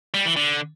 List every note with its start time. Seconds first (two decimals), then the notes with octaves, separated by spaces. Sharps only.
0.14 G3
0.25 E3
0.36 D3